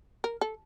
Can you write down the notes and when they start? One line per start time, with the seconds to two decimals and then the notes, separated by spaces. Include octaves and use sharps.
0.24 A#4
0.41 A4